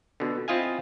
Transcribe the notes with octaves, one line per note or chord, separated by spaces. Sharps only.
B2 D3
C4 E4 F4 D#5 F5 G#5